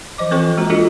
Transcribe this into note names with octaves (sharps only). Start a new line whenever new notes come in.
E3 F3 D#5 D6
E3 C4 F4 A4 G5 C#6
G#3 A#3 F#4 A#5
D4 F4 F#4 G#4 A4 D#5